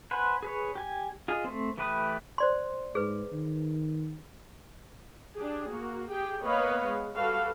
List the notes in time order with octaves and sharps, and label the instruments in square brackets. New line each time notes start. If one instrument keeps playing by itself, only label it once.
[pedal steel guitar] B4 C5 F#5 G#5
G#4 B4 C#5
G4 G#5
F4 G#4 D#5
A3 C4
E3 A3 G4 B4 D#6
[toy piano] C5 D5 C6
[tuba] G#2 [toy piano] G#4 B4
[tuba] D#3
[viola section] D4 G4 G#4
A#3 F#4
G4 G#4 G5
A#3 B3 B4 C#5 D#5 F5
G#3
G3 F#4 A4 B4 F5